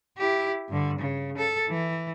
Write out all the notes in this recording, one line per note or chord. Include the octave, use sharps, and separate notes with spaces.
E4 G4
G2 D3
C#3
A4
E3